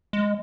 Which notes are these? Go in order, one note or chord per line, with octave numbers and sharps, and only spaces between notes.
G#3